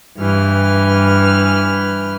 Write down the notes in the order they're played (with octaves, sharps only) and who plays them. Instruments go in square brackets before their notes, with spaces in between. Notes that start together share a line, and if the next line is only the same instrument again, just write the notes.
[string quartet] G2 E3 F6